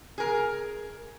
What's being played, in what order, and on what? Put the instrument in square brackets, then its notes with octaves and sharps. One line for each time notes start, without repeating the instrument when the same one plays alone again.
[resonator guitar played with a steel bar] G#4 A#4